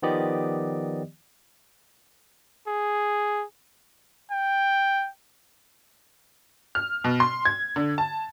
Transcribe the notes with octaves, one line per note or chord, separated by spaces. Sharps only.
D#3 F3 B3 G4 D5 D#5
G#4
G5
F6
B2
C6
G#6
D3
A5